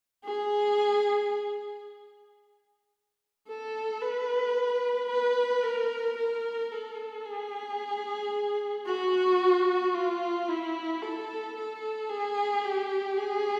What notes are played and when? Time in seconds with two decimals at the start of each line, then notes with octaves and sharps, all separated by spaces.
0.25 G#4
3.48 A4
4.01 B4
5.09 B4
5.63 A#4
6.17 A#4
6.71 A4
7.25 G#4
8.86 F#4
9.95 F4
10.49 E4
11.03 A4
11.57 A4
12.10 G#4
12.64 G4
13.17 G#4